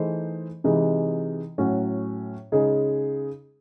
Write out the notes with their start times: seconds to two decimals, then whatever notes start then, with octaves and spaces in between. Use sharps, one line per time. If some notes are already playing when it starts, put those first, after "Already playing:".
Already playing: E3 A3 D#4 G#4 C5
0.64 C3 E3 G#3 D#4
1.58 A2 F#3 C#4 F#4
2.52 C#3 G#3 D#4 G#4